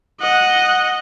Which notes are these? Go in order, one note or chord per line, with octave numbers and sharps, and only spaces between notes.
D#5 F#5